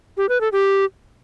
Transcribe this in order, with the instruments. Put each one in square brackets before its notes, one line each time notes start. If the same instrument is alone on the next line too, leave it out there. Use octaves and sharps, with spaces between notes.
[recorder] G4
B4
A4
G4